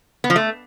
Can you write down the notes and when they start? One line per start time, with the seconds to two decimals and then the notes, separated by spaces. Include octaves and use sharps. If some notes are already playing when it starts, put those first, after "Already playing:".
0.24 B3
0.30 F3
0.36 A3